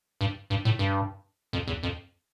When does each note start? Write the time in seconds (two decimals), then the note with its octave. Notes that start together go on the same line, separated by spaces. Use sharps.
0.21 G2
0.50 G2
0.65 A2
0.79 G2
1.53 F2
1.68 E2
1.83 F2